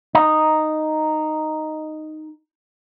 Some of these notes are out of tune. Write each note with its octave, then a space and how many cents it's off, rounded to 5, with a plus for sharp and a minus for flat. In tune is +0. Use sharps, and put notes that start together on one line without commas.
D#4 -5